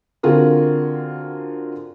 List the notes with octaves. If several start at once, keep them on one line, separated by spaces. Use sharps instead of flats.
D3 C4 F4 F#4 G#4 A#4